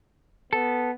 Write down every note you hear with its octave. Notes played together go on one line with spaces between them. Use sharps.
B3 A4